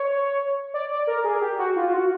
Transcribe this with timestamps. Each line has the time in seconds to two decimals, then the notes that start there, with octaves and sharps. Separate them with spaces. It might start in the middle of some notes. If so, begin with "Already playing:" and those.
Already playing: C#5
0.74 D5
0.90 D5
1.07 A#4
1.24 G#4
1.41 G4
1.59 F#4
1.76 F4
1.89 F4
1.93 F#4